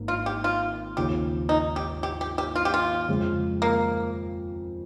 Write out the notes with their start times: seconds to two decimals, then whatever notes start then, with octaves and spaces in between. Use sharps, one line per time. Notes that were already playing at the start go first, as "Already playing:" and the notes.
Already playing: G#1 G#2 A#3
0.08 F4
0.26 G4
0.44 F4
0.97 D#2 C#3 F3 G4
1.49 D#4
1.76 G4
2.03 G4
2.21 G4
2.38 G4
2.55 F4
2.65 G4
2.74 F4
3.08 F2 C#3 G#3
3.62 A#3